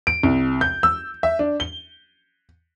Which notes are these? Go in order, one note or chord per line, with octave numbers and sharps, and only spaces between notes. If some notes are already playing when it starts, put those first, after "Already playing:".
D7
C2
G6
E6
E5
D4
G7